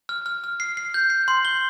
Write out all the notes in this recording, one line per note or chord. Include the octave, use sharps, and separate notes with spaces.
F6
F6
F6
C7
C7
G6
C7
C6
G7